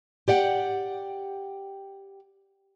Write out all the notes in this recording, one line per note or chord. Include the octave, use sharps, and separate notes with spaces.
G4 D5 F#5 G5